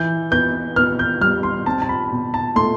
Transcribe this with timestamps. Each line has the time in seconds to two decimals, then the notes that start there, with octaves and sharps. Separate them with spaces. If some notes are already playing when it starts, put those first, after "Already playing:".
Already playing: E3 G6
0.31 B3 G6
0.76 B3 F6
0.99 G6
1.21 G3 F6
1.43 C6
1.66 C4 A5
1.82 A5
1.89 B5
2.11 B2
2.34 A5
2.56 A3 C6